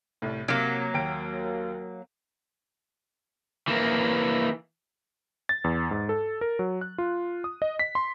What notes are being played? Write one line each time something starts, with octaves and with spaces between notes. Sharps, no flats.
C2 A2
C3 F#3 A#3 F6 D7
D#2 G5 D7
E3 A#3
A6
E2
G#2
A4
A#4
F#3
F#6
F4
D#6
D#5
B6
C6